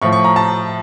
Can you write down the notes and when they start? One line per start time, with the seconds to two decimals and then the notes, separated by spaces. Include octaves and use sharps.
0.02 A2 F3 C#6
0.13 C#6
0.24 A#5
0.36 A5